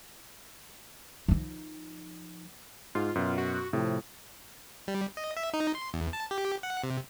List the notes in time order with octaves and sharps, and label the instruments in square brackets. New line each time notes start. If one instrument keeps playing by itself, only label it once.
[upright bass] F3 D#4
[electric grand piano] G#2 [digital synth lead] F4
[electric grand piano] F#2 B2
[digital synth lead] F#4
[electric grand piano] A2 F3 [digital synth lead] C3
[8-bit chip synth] G3
D#5
E5
D#4
C6
E2
A5
G4
F#5
C3